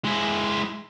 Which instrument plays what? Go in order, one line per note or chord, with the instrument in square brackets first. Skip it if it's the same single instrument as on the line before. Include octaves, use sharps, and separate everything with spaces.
[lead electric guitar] G#3 E4